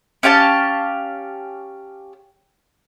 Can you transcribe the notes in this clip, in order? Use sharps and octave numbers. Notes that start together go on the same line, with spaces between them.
C#4 G4 F5 A5